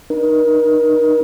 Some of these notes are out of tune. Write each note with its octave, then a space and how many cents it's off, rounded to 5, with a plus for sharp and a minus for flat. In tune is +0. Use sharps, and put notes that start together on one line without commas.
D#4 -40 A#4 +35